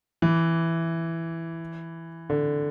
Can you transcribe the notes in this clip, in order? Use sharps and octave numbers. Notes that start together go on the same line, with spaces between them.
E3
D3